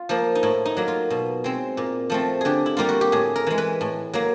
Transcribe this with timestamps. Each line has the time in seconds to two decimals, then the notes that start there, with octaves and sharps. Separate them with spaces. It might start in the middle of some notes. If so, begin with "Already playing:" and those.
Already playing: F4
0.09 F3 A#3
0.35 D#4
0.43 A2 E4
0.66 D#4
0.77 F#3 A#3
0.88 F4
1.10 B2
1.44 G#3 C4
1.77 A#2
2.10 F3 A3 C4
2.41 D3 G4 G#4
2.66 E4
2.77 G3 A#3 F4
2.89 F#4
3.01 G4
3.12 A2 G#4
3.36 A#4
3.47 E3 G#3
3.58 B4
3.81 A2
4.14 F#3 A#3